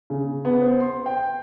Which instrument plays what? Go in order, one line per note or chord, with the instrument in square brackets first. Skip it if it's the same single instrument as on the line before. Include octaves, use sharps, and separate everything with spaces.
[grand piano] C#3
B3
C5
C6
G5